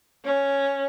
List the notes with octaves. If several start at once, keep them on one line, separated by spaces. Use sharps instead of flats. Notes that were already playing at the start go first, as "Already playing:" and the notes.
C#4